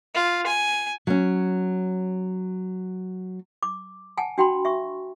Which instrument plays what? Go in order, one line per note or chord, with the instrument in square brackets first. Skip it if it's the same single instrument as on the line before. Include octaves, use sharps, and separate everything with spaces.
[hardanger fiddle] F4
G#5
[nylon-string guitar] F#3 C#4
[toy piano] D6
F#5 G#5 A5
D4 F#4 G5 A5 B5 C6
E5 C#6